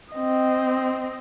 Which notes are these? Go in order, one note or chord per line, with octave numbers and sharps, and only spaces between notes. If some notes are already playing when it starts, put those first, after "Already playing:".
C4 D#5